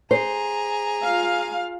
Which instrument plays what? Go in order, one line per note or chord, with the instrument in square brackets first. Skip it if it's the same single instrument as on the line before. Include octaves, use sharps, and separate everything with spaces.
[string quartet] G#4 A#5 [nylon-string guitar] C5
[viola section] F4 F5